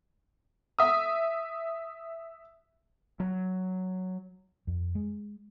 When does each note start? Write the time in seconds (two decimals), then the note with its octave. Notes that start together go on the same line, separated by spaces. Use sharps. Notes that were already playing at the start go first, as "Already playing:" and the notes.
0.79 E5 D#6
3.20 F#3
4.67 F2
4.95 G#3